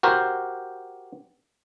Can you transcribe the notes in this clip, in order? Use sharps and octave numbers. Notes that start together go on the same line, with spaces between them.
F#4 G4 A#4 C5